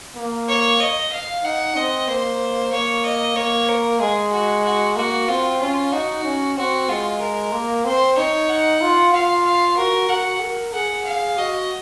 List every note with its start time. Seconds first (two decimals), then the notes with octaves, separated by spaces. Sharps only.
0.16 A#3
0.48 C#5
0.80 D#5
1.12 F5
1.44 D#4 F#5
1.76 C4 D#5
2.08 A#3 C5
2.72 A#3 C#5
3.04 D#5
3.36 A#3 C#5
3.68 A#4
4.00 G#3 G#4
4.33 F#4
4.64 F#4
4.96 A#3 F#4
5.28 C4 F4
5.60 C#4 F4
5.92 D#4 F#4
6.24 C#4
6.57 C4 F#4
6.89 G#3 F4
7.20 A#4
7.53 A#3
7.85 C4 C5
8.17 D#4 C#5
8.49 F#5
8.81 F4
9.13 F4 F5
9.45 F5
9.77 F#4 A#4
10.09 F#4 F#5
10.42 A#4
10.73 G#4 F#5
11.05 F5
11.37 F#4 D#5